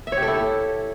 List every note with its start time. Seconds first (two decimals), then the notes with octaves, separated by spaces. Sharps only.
0.07 E5
0.12 C#5
0.17 G4
0.22 A4
0.28 E4